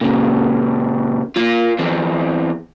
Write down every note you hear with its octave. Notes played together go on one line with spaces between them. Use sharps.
A#2 C#3
A#3 F4
E2 C4